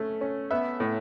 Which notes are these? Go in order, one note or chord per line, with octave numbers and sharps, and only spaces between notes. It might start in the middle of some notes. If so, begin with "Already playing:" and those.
Already playing: A3 C#4
C#4
B3 E5
A2